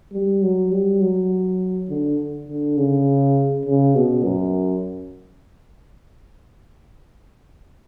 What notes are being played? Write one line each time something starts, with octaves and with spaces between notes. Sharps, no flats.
G3
F#3
G3
F#3
D3
D3
C#3
C#3
B2
F#2